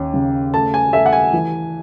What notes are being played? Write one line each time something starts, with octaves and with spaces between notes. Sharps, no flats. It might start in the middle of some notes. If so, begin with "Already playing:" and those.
Already playing: D#2 C#4
C#3
A3 A5
G#5
A3 E5
F#5
G#5
E3